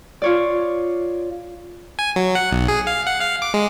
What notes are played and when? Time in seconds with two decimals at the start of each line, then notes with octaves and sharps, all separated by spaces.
0.22 F4 C#5 D5
1.99 G#5
2.16 F#3
2.35 F#5
2.52 B1
2.68 G#4
2.87 F5
3.07 F#5
3.20 F5
3.42 D6
3.54 G#3